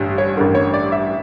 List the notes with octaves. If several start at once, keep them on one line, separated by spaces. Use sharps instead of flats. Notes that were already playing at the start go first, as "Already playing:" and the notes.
Already playing: A1 G2 D3
C#5
A1 G2 D3 A#4
C#5
D5
E5